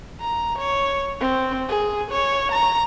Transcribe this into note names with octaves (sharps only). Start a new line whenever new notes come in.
A#5
C#5
C4
G#4
C#5
A#5